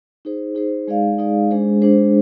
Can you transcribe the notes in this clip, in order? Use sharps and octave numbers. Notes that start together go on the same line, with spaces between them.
D#4 G#4 C5
D#4 G#4 C5
G#3 D#4 G#4 D5 F5
G#3 D#4 G#4 D5 F5
G#3 D4 G#4 C5
G#3 D4 G#4 C5